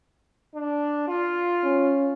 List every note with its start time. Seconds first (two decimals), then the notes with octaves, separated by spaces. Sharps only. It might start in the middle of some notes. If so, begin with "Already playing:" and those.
0.55 D4
1.08 F4
1.64 C#4